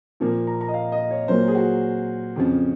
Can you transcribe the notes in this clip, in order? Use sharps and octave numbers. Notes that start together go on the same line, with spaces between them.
A#2 F3 A#3
A#5
A#5
D#5
F5
D#5
C#5
A#2 F#3 A#3 C5
G#4
F#4
F2 C#3 F3